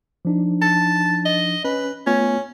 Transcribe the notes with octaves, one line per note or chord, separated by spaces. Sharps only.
F3 D4 D#4
A5
D#5
C#4 B4
A3 B3 C#4 F4